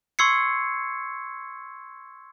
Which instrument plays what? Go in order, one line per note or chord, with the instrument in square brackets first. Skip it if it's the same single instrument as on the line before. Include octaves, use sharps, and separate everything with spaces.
[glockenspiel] C6 C#6 E6 G#6 C7 C#7